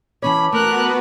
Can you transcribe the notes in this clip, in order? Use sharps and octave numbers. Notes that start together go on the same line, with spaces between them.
E3 C#4 C#5 A5 B5 D6
A3 B3 F#4 A#4 B4 F#6